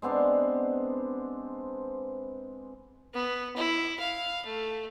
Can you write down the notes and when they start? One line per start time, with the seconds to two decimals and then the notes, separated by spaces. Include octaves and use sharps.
0.02 G#3 B3 C4 D4
3.14 B3
3.56 E4
4.00 F5
4.46 A3